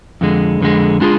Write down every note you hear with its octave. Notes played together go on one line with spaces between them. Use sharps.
F2 D3 G#3
F2 D3 G#3
G#3 D4 F4 G#4